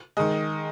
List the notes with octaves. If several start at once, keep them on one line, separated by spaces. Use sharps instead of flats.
D#3 G#3 D#5